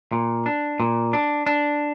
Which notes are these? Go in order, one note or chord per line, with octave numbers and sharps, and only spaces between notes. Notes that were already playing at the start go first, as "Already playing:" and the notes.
A#2
D4
A#2
D4
D4